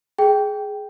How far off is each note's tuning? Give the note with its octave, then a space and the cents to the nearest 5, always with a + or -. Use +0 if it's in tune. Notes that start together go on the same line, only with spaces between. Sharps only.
G#4 +10 G5 +0